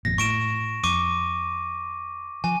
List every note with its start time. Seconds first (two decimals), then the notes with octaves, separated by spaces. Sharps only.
0.05 G#1 F2 A#2 A#6
0.18 A2 C#6 D7 E7
0.83 F2 C#6 D6 D#7
2.44 F3 G#5